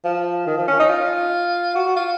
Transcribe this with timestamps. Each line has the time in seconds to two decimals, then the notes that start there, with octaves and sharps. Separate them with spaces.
0.05 F3
0.47 D#3
0.57 F3
0.68 C#4
0.79 D#4
0.89 F4
1.75 F#4
1.86 F#4
1.96 F4